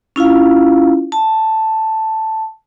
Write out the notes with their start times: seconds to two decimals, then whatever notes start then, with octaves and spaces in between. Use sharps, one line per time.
0.16 C#4 E4 F4 F5
1.12 A5